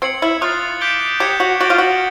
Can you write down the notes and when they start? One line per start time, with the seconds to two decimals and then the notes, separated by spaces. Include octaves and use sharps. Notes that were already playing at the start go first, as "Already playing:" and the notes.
0.02 C4 G#6 C#7 F#7
0.22 E4
0.41 F4 D#6 F#6 A6 C7
0.81 D6 G6 B6 D7 G7
1.20 G4 D#6 G#6 C#7 E7
1.40 F#4
1.60 F#4 A6 D7 G7
1.70 F4
1.78 F#4